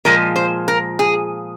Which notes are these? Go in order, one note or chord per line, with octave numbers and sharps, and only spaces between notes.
A#2 F3 G#3 A#4
C5
A#4
G#4